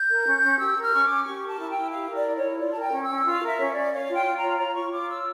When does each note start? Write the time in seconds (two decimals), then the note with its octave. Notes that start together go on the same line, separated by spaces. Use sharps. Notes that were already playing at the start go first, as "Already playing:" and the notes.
Already playing: G6
0.09 A#4
0.26 C#4
0.42 C#4
0.59 G4 E6
0.76 A#4
0.81 F6
0.93 C#4 C#6
1.04 C#4 D6
1.26 G4 C#6
1.42 A#4
1.48 A5
1.58 E4
1.70 G5
1.76 E4
1.92 G4 F5
2.09 A#4
2.14 D5
2.26 E4
2.36 C#5
2.42 E4
2.59 F4 D5
2.71 A#4 A5
2.81 G5
2.92 C#4
3.03 E6
3.09 C#4
3.25 F4 F5
3.42 A#4
3.47 E5
3.59 C#4 C#5
3.71 D5
3.76 C#4
3.92 C#5 F5
4.09 F4
4.14 G5
4.25 F4
4.37 A#5
4.42 C#5
4.58 C#5 A#5
4.75 F4 C#6
4.91 F4 D6
5.09 C#5 E6